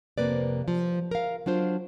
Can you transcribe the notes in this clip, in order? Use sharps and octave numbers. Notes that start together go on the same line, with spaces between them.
F2 C3 A#3 B4 D5
F3
A#4 F5
F#3 D4 F4 C5